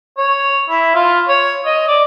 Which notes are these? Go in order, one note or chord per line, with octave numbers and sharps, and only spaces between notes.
C#5
E4
F4
C#5
D#5
D5